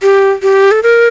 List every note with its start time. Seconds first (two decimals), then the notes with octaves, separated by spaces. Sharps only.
0.02 G4
0.42 G4
0.71 A4
0.83 A#4